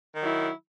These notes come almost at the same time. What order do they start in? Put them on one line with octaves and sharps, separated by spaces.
D#3 F#3 E4